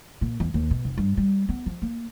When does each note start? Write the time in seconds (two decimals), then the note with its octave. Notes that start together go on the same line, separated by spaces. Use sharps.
0.21 A#2
0.40 E2
0.54 D#2
0.71 B2
0.85 F1
0.98 G2
1.17 G3
1.49 B3
1.66 F3
1.82 A#3